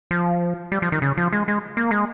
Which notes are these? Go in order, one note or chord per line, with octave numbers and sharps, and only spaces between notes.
F3
G3
F3
D#3
C#3
F3
G#3
G#3
A#3
G#3